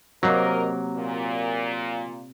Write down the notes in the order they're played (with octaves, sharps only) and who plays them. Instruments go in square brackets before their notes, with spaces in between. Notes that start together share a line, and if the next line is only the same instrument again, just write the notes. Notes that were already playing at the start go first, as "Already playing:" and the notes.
[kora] C3 A#3 [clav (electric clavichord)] F#3 [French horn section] A#4 D#5
[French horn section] A#2